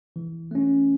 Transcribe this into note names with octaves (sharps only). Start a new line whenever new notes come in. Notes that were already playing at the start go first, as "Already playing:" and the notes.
E3
A3 C#4